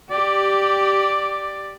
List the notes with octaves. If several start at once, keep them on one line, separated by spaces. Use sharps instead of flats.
G4 D5